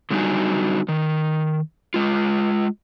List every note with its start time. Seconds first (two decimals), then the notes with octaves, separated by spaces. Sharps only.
0.10 D3 F#3 G3 D#4 F#4 G#5
0.88 D#3
1.94 G#3 F4